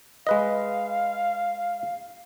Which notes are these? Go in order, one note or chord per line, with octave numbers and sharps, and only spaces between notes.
G#3 B4 D#5 F5